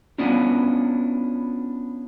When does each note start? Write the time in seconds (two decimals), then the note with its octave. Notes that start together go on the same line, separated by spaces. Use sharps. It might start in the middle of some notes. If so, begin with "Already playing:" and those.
0.18 B3 C#4 D4 E4 F4